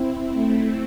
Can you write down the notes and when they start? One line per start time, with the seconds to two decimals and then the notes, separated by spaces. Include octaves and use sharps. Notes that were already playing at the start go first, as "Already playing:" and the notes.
Already playing: C4 E4
0.33 A3 C4